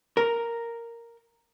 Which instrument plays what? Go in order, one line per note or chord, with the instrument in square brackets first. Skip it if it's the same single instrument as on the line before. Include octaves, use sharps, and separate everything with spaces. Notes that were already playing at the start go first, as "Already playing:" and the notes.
[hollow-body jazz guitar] A#4